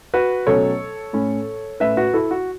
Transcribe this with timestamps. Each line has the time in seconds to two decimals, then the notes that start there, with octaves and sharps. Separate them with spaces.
0.14 F#4 B4
0.47 B2 F#3 A3 C#4 A4 C#5
1.13 A2 A3 C#4
1.80 A2 A3 C#4 B4 E5
1.97 F#4 B4
2.14 E4 A4
2.31 F#4